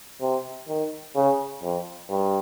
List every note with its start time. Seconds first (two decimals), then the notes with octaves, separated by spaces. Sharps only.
0.21 C3
0.68 D#3
1.15 C#3
1.62 F2
2.10 G2